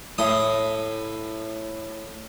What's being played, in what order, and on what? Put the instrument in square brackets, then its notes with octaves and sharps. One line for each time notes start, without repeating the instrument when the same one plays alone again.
[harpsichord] A2 D#6